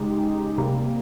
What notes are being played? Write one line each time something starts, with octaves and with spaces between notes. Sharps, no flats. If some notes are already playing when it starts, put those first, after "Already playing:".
Already playing: C#3 G#3 D#4 G4
C3 G3 A#3